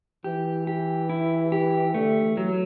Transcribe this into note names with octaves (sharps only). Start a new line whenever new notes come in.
E3 G4
G4
E4
G4
D3 A3
E3
F#3